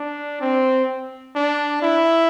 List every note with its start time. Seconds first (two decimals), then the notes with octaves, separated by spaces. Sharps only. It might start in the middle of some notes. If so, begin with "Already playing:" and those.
Already playing: D4
0.41 C4
1.35 D4
1.82 E4